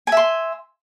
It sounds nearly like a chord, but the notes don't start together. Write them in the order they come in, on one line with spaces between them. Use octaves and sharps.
G#5 E5 C6